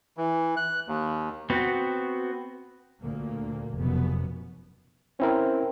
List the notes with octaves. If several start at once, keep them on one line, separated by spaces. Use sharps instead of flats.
E3
F#6
D#2
B3 C4 F#4
D2 A#2 A#3
F1 F#2 B2 B3
C4 C#4 E4 A#4